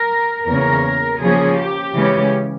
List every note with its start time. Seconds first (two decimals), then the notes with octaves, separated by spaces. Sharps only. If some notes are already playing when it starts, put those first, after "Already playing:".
Already playing: A#4
0.47 E2 C#3 E3 A#3 C#4 A#4
1.21 C#3 F3 A#3 C#4 G#4
1.58 G4
1.95 C#3 E3 G#3 C#4